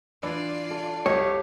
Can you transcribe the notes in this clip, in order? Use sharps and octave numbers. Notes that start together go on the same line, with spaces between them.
E3 D4 F4 D5
A4
C2 G4 C#5 D#5